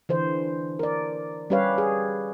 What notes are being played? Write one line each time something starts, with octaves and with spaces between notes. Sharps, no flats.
D3 E3 C5
A#4 D5
G3 C#4 G4 B4 C#5 F5
G#4